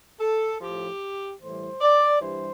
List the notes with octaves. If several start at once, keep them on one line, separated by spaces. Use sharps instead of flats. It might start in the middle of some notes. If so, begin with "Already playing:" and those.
A4
A2 F3 G4
A2 E3 G3 C5
D5
G2 E3 G3 C5